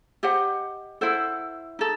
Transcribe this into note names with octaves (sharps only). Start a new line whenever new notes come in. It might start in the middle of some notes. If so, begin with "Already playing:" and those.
G4 C5 D#5 F#5
E4 A4 C5 F#5
D#4 A4